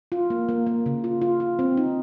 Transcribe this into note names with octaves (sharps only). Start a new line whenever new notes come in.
F4
A#3
A#3
A#3
C#3
F4
F4
F4
C4
D#4